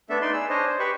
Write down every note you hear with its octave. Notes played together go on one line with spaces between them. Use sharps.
A3 B3 D4 A4 E5
D#4 B4 D5 C6
G#4 E6
D4 C5 C#5 D#5
C5
G4 B4 B5 C#6